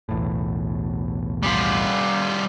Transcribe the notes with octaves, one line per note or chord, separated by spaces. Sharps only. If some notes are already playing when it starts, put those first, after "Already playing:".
B1 E2 A2
G3 F4